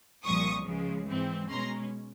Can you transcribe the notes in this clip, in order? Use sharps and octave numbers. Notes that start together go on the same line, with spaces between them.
C2 A#2 F3 C#6 D#6
C#2 C#3 F3 G#3
G#2 E3 G#3 C4
B2 G#3 C#4 A#5 C6